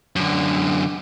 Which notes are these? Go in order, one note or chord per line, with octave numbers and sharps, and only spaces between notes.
F#2 D3